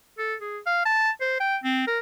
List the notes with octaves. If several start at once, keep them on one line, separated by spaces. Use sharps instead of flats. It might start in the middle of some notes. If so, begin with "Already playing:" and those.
A4
G#4
F5
A5
C5
G5
C4
A#4